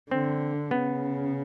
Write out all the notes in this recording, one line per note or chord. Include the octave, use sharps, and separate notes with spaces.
D3 C4
C#3 B3